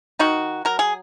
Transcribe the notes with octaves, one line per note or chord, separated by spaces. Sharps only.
D#3 D#4 F#4
F#3 A#4
G#4